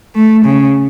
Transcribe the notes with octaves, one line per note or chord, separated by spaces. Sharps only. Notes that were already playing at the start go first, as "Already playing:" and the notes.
A3
C#3